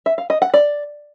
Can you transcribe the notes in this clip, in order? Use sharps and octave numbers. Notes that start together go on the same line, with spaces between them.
E5
F5
D#5
F#5
D5